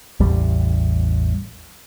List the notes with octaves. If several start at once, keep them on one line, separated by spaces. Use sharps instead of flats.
A1 E2 G3